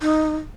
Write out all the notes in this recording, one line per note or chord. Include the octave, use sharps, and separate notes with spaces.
D#4